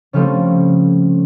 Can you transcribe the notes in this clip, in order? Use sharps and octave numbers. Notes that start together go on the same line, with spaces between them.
C#3 F3 G3 A3 C4 D#4